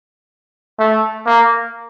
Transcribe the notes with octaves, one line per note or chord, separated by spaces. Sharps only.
A3
A#3